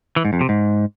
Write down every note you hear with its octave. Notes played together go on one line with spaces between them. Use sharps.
E3
G#2
F2
C3
G#2